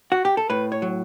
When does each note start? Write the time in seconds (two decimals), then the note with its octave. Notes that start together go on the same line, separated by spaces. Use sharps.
0.12 F#4
0.25 G4
0.37 A4
0.50 A2 B4
0.72 C#5
0.82 F#3